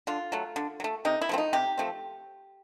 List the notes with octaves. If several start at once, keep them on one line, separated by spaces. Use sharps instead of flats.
D3 F4
F#3 A3
D3
F#3
A3
C3 D#4
E4
F3 A3 C4
D#4
C3 G4
F3 A3 C4